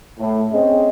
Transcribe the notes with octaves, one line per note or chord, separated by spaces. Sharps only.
A2
C4 C#4 G#4 D#5